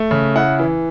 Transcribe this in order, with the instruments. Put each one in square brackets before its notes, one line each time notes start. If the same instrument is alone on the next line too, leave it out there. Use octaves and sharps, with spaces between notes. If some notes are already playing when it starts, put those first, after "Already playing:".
Already playing: [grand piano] A3
C#3
E4 F#5
E3